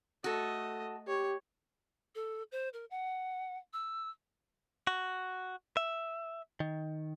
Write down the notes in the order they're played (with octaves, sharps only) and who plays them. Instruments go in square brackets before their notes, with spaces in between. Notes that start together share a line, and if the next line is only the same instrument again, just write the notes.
[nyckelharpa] A3 D#5 [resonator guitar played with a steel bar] F#4 A4
[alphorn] G4 [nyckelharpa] C#5
[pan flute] A4
C5
A#4
F#5
E6
[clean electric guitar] F#4
E5
D#3